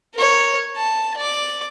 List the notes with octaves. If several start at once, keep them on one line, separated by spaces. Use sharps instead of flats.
A#4 C#5
A5
D5 D6